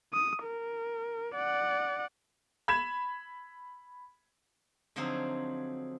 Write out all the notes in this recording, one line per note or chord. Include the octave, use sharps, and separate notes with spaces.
D#6
A#4
D5 F#5
B5 G#6 E7
D3 F3 F#3 C4 D#4 G#4